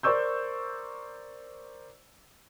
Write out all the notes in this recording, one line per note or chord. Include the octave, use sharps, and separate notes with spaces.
A#4 C5 D5 C#6 E6 G6